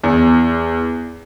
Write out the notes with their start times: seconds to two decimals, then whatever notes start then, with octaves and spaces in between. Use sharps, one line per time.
0.04 E2